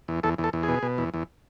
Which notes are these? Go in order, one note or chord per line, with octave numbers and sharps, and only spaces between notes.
E2
E2 A4
E2
A4
E2
G#4
B2
B2
E2
E2